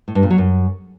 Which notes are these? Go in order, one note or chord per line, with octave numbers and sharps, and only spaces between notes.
A2
G2
A#2
F#3
F#2